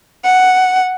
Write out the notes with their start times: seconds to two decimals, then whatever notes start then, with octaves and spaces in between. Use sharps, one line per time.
0.25 F#5